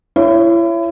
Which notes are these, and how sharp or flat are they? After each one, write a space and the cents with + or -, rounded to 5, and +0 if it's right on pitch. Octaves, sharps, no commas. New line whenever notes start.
E4 +35 C#5 +0